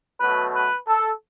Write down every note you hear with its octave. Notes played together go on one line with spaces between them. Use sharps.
B2 F#3 A3 B4
B4
A4